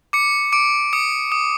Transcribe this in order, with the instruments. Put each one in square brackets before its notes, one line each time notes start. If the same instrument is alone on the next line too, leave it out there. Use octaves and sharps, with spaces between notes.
[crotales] D6 C#7
D6 D7
D#6 C#7
D#6